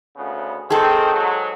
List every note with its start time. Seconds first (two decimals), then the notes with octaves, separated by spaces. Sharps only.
0.16 D2 C#3 B3
0.70 D#3 C4 G#4 A4
1.12 G#2 F#3